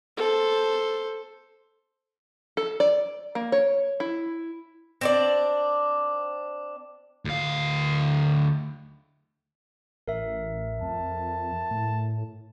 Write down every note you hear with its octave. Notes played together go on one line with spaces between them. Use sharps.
A4 C5
A4
D5
A#3
C#5
E4
C4 D4 D5
D2 F5
A1 A#4 E5
F2 A5
A2